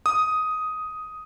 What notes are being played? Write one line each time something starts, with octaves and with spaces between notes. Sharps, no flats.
D#6